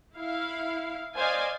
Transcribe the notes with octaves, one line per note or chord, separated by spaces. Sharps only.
E4 F5
C5 D5 D#5 F5 G#5